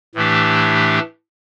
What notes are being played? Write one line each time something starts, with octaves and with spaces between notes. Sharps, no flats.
A2 E3 A3 D4 G4